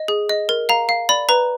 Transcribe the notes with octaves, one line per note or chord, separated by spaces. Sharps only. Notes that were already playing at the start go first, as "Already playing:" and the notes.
Already playing: D#5
G#4
D#5
A#4
F5 A#5
F5
D5 B5
B4 A#5